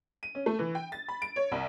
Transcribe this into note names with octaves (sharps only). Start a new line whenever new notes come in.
D#7
C#4
A3
E3
G5
A6
B5
D7
C#5
C2